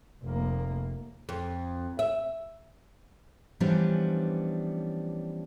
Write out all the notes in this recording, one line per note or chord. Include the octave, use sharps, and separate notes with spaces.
F1 A#3
F2
E5
E3 F3 G3 B3 C#4 D4